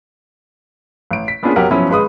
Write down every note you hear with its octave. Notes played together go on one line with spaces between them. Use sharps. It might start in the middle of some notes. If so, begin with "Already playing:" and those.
A1 D7
B6
A#3 B3 C#4 D4 F4 G#4
F#1 B1 F#3 G4 A#4 F#5
F3 F#3 B3 C#4 E4
G#1 G#3 B4 B5 D#6